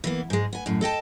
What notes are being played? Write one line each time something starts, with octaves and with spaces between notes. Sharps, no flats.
E3 A#3 B3
G#2 G#3
B3 G#5
F#2 A2
A4 D#5 G5 A5